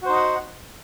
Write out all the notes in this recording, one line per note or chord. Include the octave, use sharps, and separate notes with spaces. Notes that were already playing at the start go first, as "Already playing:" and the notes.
D#4 F#4 C5 D#5 F#5